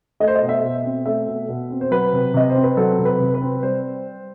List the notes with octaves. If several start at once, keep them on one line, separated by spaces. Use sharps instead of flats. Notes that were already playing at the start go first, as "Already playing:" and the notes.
A3 D#5
C5
D#5
B2
E5
B2
C4
A3 E5
B2
B2
C4
C5
F#3 B4
C3
C3 D#5
C5
C4
B4
F#3 A4
C3
B4
C3
B4
C4
G3 C5